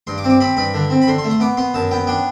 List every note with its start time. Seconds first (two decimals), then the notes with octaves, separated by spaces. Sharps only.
0.07 G2 C6
0.18 D6
0.24 C4
0.30 D6
0.40 C4 B5
0.57 G2 B5
0.74 D3
0.90 C4
1.02 B5
1.08 D3 C6
1.18 C6
1.24 A3
1.30 C6
1.40 B3 D6
1.57 B3 C6
1.74 F#2 A5
1.91 B3 G5
2.07 D4 G5